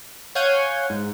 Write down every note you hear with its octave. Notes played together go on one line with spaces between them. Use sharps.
C#5 F5 F#5 G#5 G6 G#6
G#2